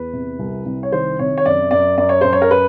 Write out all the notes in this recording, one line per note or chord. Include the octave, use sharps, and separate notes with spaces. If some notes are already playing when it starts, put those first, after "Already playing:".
Already playing: E2 B4
C3
C2
C2
C#5
D#3 C5
C3 C#5
C#5
F#2 D5
F#2 D5
F#2 D5
C#5
F#2 C5
C#5
A#4
B4